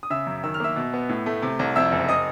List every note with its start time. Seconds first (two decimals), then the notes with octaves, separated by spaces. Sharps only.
0.03 D#6
0.10 C#3 E5 E6
0.27 F#2
0.43 D#3 E6
0.54 F6
0.60 A#3 E5 E6
0.76 B2
0.94 B3
1.09 A2
1.26 A3
1.42 C3
1.59 C2
1.76 F2 E5 E6
1.92 F#1
2.09 D#5 D#6